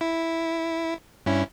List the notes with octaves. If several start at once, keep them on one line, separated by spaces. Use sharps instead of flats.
E4
G2 C#4 E4